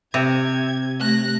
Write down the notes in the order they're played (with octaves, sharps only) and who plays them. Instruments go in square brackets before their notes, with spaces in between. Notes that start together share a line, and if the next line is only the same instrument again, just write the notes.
[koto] C3 [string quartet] G#6
[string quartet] A3 F#6 A#6